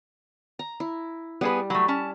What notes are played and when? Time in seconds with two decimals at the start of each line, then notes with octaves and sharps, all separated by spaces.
0.59 A#5
0.80 E4
1.41 G3 B3 G#4 B4
1.70 F#3 A3 B5
1.88 C#4 A5